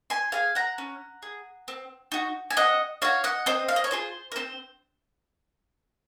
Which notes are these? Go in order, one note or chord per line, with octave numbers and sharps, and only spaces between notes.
G#5 C6
G#4 F5 G#5
F#5 A#5
C#4
G#4
C4
D#4 F#4
G#5
C4 D#5 F#5
D#4 F#4 C#5 F5
D#5 F#5
C4 C5 D#5
F5
D#5
C#5
F4 G#4 C5
A#4
C4 C5